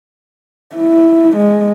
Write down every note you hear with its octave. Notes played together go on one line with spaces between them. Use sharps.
E4
G#3